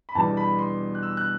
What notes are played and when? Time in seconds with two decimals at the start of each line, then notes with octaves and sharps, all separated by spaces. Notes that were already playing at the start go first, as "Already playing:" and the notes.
0.09 B5
0.15 E2 B2 G3 B3 D4 A5
0.37 B5
0.59 C6
0.95 F#6
1.03 E6
1.17 F#6